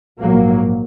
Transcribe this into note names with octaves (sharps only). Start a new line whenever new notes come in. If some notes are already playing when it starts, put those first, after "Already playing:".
A#1 G#2 F#3 A#3